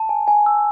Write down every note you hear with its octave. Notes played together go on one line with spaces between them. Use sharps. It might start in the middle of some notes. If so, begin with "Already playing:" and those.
Already playing: A5
G#5
G#5
E6